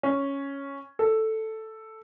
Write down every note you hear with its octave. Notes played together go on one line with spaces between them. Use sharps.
C#4
A4